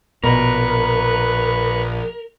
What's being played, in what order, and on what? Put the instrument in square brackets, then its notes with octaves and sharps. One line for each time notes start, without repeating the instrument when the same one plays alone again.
[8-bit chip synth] A#1 [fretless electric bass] B2 [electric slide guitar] A#4 [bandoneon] B4 C#6 F#6